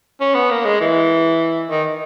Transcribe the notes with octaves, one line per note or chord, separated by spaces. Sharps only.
C#4
B3
A#3
G#3
E3
D#3